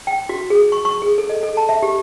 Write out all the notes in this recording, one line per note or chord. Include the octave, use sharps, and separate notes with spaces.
G5
F#4
G#4
C#6
C#6
G#4
A4
D#5
A4
A5
E5
G4